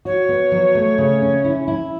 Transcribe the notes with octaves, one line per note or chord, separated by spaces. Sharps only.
F#4 C#5
B3
F#3
A3
C#3
C#4
E4
E4